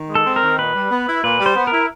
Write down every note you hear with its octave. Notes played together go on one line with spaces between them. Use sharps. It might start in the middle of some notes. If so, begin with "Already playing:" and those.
Already playing: D#3
G#3
A4
C4
A#4
D#3
A#2 B4
G3
B3
E4
A#2 B4
G3
C5
B3
A#4
E4